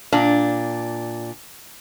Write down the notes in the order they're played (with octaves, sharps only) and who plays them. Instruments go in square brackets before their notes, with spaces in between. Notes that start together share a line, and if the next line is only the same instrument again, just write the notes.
[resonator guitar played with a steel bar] A#2 D4